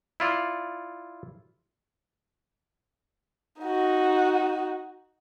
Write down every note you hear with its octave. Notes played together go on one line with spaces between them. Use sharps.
E4 F4 D5
D#4 F#4